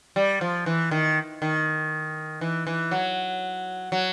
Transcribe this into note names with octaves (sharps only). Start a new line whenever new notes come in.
G3
F3
E3
D#3
D#3
E3
E3
F#3
F#3